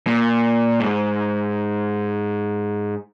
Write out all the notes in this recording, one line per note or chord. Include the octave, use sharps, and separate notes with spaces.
A#2
G#2